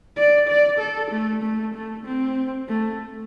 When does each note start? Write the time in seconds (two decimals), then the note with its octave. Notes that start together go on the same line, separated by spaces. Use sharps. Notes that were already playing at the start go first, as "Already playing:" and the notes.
0.16 D5
0.48 D5
0.79 A4
1.11 A3
1.42 A3
1.74 A3
2.05 C4
2.68 A3